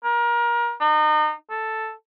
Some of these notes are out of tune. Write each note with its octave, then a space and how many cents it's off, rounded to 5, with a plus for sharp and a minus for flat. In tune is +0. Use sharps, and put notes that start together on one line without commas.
A#4 +30
D#4 -35
A4 +0